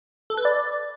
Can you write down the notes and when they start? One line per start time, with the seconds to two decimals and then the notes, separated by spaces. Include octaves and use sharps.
0.30 A4
0.38 B4
0.45 D5